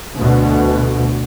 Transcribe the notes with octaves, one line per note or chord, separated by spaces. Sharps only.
D2 B2